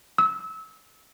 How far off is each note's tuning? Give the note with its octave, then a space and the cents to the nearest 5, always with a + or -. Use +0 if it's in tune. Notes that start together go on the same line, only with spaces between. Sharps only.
E6 -30